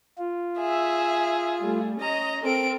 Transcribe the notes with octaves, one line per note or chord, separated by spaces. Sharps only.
F4
G#4 E5
G3 A3
C#4 D#5 A#5
C4 A4 A#4 D7